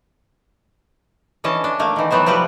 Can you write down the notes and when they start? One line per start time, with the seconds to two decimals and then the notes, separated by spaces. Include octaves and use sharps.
1.44 D3 E3 C#4 D#5 A5
1.64 D4
1.79 A3 A#3
1.96 D#3 E3
2.11 E3 F#3 B3 C5 E5
2.26 C3 F3 G3 B3 G4 B4